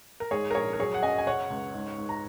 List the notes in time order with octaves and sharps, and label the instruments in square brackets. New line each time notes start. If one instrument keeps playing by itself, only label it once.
[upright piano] A#4
G#2 G#4 C#5
A#4
A#1 G#4 C#5
A#4
F#3 G#4 C#5
F#5
F#2 D#5 G#5
G#5
C#3 C#5 F#5
C#2
G#2
G#2
A#5